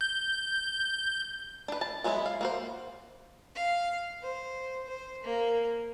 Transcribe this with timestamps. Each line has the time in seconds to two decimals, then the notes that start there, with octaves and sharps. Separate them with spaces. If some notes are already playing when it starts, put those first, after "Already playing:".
0.01 G6
1.68 D4 B4
1.81 A5
2.04 F#3 G#3 B3 D4 E4
2.26 F5
2.41 A#3 F#4 C5
3.55 F5
4.22 C5
4.88 C5
5.23 A#3